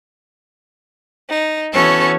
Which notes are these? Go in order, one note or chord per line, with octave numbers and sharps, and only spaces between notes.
D#4
E3 B3 C#4 F#4 A4 C#5